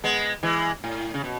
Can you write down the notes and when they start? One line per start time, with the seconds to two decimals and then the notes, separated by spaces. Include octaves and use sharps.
0.04 G#3 B3
0.43 E3 G#3
0.84 A2
1.14 C#3
1.24 B2